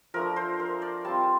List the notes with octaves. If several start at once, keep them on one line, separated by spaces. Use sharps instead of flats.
F3 A3 D4 A#4
C5
A#4
D5
G3 C4 F4 A5